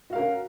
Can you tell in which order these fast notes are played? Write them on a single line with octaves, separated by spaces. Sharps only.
F#4 F5 A#4 C#4